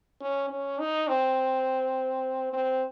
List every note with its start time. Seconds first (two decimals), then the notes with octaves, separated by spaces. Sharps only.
0.21 C#4
0.49 C#4
0.79 D#4
1.08 C4
2.53 C4